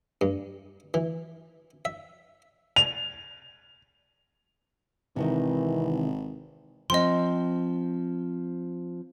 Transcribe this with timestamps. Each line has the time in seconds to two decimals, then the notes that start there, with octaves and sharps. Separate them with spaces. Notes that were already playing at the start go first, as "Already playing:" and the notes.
0.21 G2
0.94 E3
1.85 E5
2.76 F7
5.16 G#1 C3 D#3 E3
6.90 F3 C4 D#5 C6